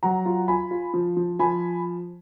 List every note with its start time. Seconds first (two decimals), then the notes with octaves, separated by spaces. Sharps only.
0.03 F#3 F#5 A#5
0.26 F4
0.48 F4 G#5 B5
0.71 F4
0.93 F3
1.17 F3
1.39 F3 G#5 B5